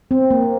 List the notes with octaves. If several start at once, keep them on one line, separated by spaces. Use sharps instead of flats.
C4
A#3